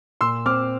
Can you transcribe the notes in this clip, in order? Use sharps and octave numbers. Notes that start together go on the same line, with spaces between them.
A#2 C6 E6
C4 D6 F6